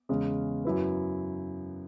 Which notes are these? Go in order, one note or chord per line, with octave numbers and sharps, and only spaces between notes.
E2 C#3 G#3 C#4
F#2 F#3 E4 B4